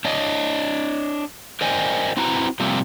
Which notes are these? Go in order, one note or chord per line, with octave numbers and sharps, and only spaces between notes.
D4 C#5 D#5
A#4 C5 D5 D#5 G5 G#5
C4 E4 F#4 B4 A#5
C3 F3 G3 A#3 C4